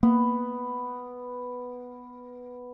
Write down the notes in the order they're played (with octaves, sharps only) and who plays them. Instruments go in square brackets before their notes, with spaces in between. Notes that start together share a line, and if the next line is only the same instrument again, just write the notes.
[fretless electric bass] A#3 [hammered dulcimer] B3